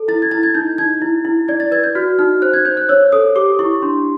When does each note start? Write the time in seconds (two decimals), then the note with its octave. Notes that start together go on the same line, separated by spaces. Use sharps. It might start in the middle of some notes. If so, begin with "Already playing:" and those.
Already playing: A4
0.08 E4 A6
0.22 G#6
0.31 E4 A6
0.43 G#6
0.55 D#4 G6
0.78 D#4 G#6
1.02 E4
1.25 E4
1.48 D5 G#6
1.60 A6
1.72 B4 G#6
1.84 G6
1.95 F#4 F6
2.19 D#4 F6
2.42 C5 F#6
2.53 G#6
2.65 C5 G6
2.77 F#6
2.89 C#5 E6
3.12 A4 D#6
3.36 G4 D6
3.59 E4 C#6
3.82 D4 C6